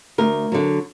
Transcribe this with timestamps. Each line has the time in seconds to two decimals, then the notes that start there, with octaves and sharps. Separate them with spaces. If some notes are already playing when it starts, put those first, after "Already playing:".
0.18 D2 A#4
0.52 D3 F#3